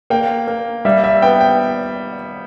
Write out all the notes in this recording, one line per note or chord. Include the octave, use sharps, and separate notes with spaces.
A#3 G5
A#3
G3 E5
E5
B3 G5
G5